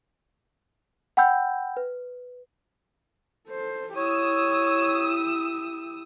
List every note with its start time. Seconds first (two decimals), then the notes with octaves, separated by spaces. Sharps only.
1.17 F#5 G5 B5 E6 G6
1.77 B4
3.48 A4 C5
3.97 E4 G4 C#5 D#6 E6